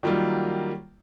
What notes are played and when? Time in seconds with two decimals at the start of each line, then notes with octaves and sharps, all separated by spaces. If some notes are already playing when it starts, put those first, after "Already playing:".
0.03 D#3 F#3 G3 A#3 F4